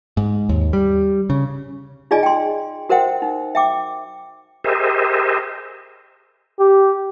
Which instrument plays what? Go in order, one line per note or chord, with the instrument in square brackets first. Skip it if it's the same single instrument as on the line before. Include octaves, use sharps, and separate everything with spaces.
[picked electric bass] G#2
D#2
G3
C#3
[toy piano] D#4 F4 G#4 D5 D#5 G#5
G5 C6
F#4 A#4 C5 E5 F#5 G5
D#4
E5 G5 D6
[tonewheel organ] G4 G#4 A#4 C5 D#5 E5
[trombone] G4